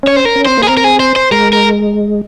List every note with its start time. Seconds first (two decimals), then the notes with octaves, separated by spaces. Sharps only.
0.03 C#4 C#5
0.16 C5
0.25 A#4
0.36 C#4
0.45 C4 C5
0.57 A#3
0.63 G#4
0.67 C4 A#4
0.77 A#4
0.84 G#4
1.00 C5
1.16 C5
1.31 G#3 A#4
1.53 A#4